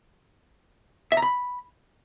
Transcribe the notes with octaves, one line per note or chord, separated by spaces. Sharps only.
E5
A#5
B5